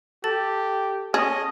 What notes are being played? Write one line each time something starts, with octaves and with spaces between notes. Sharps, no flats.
G4 A4 A5 A6
C#4 G#4 D#5 A5